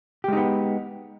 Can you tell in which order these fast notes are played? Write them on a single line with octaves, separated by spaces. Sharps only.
G4 G#3 D#4 B3